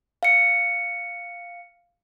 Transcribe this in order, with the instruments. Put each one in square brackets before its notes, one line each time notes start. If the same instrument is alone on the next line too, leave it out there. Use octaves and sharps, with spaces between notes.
[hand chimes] F5 C#7